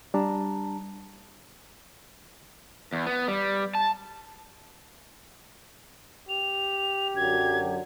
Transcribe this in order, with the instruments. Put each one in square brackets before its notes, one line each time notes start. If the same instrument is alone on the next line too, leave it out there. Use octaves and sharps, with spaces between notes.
[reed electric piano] G3 D4 A5 A#5
[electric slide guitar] E2
B3
G3
A5
[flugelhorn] G4 [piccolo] F7
[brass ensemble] F#2 D3 F#3 [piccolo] G#6